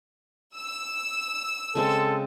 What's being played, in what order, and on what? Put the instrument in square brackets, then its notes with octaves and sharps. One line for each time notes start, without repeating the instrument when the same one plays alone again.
[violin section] E6
[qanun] C#3 G#3 C4 [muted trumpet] A4